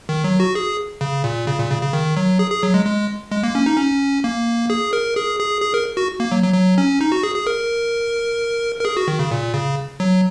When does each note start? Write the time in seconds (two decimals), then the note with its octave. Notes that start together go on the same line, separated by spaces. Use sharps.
0.09 D#3
0.24 F#3
0.40 F#4
0.55 G#4
1.01 C#3
1.24 A#2
1.47 C#3
1.59 A#2
1.70 C#3
1.82 C#3
1.93 D#3
2.17 F#3
2.39 G#4
2.51 G#4
2.63 F#3
2.74 G#3
2.85 G#3
3.31 G#3
3.43 A#3
3.55 C#4
3.66 D#4
3.77 C#4
4.24 A#3
4.70 G#4
4.93 A#4
5.16 G#4
5.39 G#4
5.62 G#4
5.74 A#4
5.97 F#4
6.20 A#3
6.32 F#3
6.43 F#3
6.54 F#3
6.78 C#4
7.01 D#4
7.12 F#4
7.23 G#4
7.35 G#4
7.47 A#4
8.79 A#4
8.85 G#4
8.97 F#4
9.08 D#3
9.19 C#3
9.31 A#2
9.54 C#3
10.00 F#3